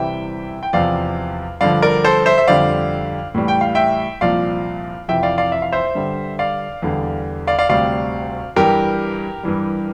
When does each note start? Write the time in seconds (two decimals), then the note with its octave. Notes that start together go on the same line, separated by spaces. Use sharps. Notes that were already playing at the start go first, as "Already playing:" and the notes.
Already playing: C2 C3 E3 G3 E5 G5
0.63 G5
0.73 E2 C3 F3 D5 F5
1.61 G2 D3 F3 D5 F5
1.82 A#4 D5
2.04 A4 C5
2.26 C5 E5
2.38 E5
2.47 F2 D3 G3 D5 F5
3.34 A2 E3 G3
3.48 G5
3.61 F5
3.75 E5 G5
4.21 C2 A#2 F3 D5 F5
5.08 F2 C3 E3 E5 G5
5.23 D5 F5
5.38 D5 F5
5.52 E5
5.62 F5
5.73 C5 E5
5.95 G2 D3 G3
6.39 D5 F5
6.82 E2 D3 G3
7.47 D5 F5
7.59 D5 F5
7.69 D2 C3 G3 D5 F5
8.56 G2 E3 G3 G4 A#4
9.43 G2 E3 G3